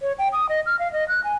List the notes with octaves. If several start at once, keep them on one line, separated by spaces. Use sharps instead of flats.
C#5
G5
D#6
D#5
F6
F5
D#5
F#6
G#5